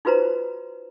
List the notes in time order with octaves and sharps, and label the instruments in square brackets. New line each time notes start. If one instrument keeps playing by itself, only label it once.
[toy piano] D#4 F4 F#4 B4 C5 A#5